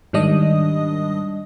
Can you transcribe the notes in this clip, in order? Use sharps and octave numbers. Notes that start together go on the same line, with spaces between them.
G#2 D#3 G3 D4 D#5 D#6